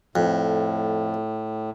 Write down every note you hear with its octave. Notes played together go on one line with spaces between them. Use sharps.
F2 A2